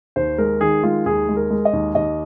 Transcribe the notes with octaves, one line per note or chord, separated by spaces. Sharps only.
D#2 C5
G#3 A#4
D#3 G#4
G#3 F4
D#2 G#4
G#3
A#4
G#3
D#5
D#2
D#2 D#5